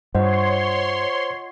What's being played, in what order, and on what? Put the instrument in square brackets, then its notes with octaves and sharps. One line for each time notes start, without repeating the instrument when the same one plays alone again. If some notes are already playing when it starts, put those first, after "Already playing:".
[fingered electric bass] G2 [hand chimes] F4 D#5 F#5 [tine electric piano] C5 [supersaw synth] C#5 C6